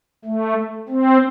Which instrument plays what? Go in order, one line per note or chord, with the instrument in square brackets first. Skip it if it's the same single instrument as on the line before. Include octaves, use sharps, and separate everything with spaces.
[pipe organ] A3
C4